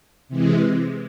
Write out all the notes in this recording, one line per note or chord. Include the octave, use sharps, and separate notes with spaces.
C3 E3 G#3